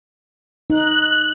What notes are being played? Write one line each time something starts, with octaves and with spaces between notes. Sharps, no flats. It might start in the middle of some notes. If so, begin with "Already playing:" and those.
D#4 F#6